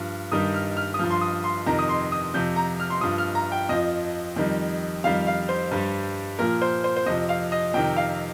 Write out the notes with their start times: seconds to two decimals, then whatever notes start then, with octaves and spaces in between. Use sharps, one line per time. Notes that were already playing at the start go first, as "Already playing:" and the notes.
Already playing: G2 F3 F6
0.32 G2 D#3 G3 D#6
0.54 F6
0.77 F6
0.94 D#6
0.99 G2 F3 F6
1.10 C6
1.21 D#6
1.44 C6
1.66 F2 C3 D#3 A#5
1.79 D#6
1.89 C6
2.12 D#6
2.34 F2 C3 F3 G6
2.56 A#5
2.80 F6
2.90 C6
3.01 G2 F3 D#6
3.18 F6
3.35 A#5
3.52 G5
3.69 F2 F3 D#5
4.36 F2 D#3 G3
5.04 F2 D#3 G3 F5
5.27 F5
5.49 C5
5.71 G2 G3
6.39 A#2 F3 A#4
6.62 C5
6.84 C5
6.96 C5
7.06 F2 C3 F3 D#5
7.29 F5
7.52 D#5
7.74 F2 C3 D#3 G5
7.97 F5